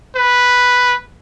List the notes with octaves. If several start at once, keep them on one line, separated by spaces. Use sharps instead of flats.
B4